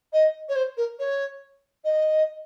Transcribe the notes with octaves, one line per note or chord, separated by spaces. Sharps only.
D#5
C#5
C5
A#4
C#5
D#5